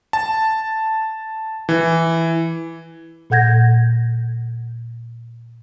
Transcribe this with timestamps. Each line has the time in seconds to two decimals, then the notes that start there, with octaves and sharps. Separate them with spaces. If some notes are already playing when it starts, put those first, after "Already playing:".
0.13 A5
1.69 E3
3.30 A#2 A4 F#5 G6 G#6 A#6